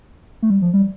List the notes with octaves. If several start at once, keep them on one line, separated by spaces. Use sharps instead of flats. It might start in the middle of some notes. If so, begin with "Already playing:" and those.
A3
G3
F3
G3